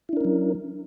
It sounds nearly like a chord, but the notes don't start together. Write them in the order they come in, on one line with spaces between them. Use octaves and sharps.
E4 D4 A#4 C#4 F#3